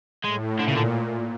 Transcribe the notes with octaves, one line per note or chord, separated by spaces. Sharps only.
A2 G#3
A#2 D3
C#3
D3